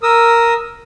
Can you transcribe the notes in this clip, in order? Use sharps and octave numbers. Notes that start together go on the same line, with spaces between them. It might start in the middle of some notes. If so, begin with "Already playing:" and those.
A#4 D#6 E6